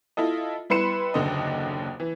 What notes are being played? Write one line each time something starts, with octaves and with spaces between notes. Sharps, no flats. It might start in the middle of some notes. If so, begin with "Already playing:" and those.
E4 F4 A4 D#5
G3 E4 B4 C6 C#7 E7
F#1 D#2 D3 D#5
E3